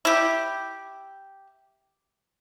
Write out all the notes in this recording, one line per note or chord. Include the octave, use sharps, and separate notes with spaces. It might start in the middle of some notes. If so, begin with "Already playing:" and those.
E4 G4